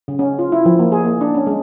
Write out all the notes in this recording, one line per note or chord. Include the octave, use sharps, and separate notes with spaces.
C#3
C#4
F4
E4
F3
A#3
G#4
A#3
D4
C#4
G#3